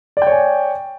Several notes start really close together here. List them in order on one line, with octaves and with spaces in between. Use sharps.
D5 G5 C#5 G#5